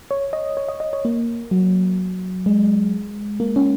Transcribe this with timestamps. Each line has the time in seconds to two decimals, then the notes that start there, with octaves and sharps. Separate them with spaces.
0.11 C#5
0.33 D#5
0.57 C#5
0.68 D#5
0.80 D#5
0.93 C#5
1.05 A#3
1.51 F#3
2.46 G#3
3.40 A#3
3.56 C#4